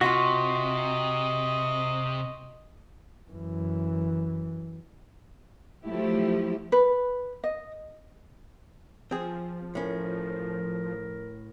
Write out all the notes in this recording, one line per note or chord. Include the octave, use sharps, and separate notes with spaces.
C3 F4 F#4 D#5 C6 C#6 B6
F#2 E3
F3 F#3 A3 E4 G4
B4
D#5
F3 C4 G#4
A2 C#4 A#4